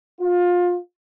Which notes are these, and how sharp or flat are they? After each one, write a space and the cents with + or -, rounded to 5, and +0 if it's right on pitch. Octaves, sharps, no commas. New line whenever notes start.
F4 +25